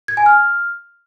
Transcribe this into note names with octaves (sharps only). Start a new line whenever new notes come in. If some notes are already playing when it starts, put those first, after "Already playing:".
G#6
G#5
F6